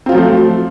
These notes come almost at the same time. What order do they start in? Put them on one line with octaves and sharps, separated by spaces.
C4 F4 F#3 F3 A3